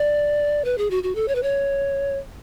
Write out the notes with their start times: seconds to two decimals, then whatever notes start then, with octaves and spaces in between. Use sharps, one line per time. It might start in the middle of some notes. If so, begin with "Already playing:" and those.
Already playing: D5
0.65 B4
0.78 G#4
0.91 F#4
1.03 F#4
1.15 A4
1.28 C#5
1.35 B4
1.43 C#5